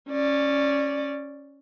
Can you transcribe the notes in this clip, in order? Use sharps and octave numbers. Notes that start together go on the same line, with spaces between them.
C#4 D5